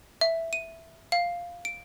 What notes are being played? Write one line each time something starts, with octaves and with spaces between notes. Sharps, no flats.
E5
D#7
F5
D7